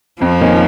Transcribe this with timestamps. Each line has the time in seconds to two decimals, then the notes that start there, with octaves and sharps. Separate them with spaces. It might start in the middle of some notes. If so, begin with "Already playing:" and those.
0.21 F2 F3
0.41 D#3 A#3 C#4